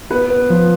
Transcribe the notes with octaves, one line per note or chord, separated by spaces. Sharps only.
B3 B4
B3
F3